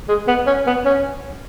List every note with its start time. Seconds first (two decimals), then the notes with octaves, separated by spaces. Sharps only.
0.08 G#3
0.28 B3
0.47 C#4
0.67 B3
0.85 C#4